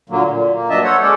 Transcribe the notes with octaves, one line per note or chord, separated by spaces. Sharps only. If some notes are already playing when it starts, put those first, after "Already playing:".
A#2 D3 F#3 A#3
A#2
A#3
G2 F#3 D4 D#5 E5 A5
A4 C5 C#5 F#5
G#3 C#4 A4 D5